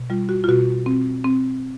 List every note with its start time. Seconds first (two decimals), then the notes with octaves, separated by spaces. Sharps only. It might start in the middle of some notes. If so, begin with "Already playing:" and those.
Already playing: B2
0.10 G3 F4
0.29 F#4
0.44 F4
0.48 B2 F#4
0.86 C4
1.24 C4